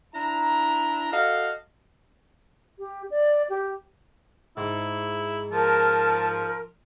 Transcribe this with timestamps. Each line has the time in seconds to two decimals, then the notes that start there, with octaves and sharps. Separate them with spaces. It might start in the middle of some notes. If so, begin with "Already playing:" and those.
0.14 D4 E4 A#5
1.12 F#4 A4 D#5 F5
2.79 G4
3.11 D5
3.49 G4
4.57 G#2 E4
5.52 F3 A#4 A5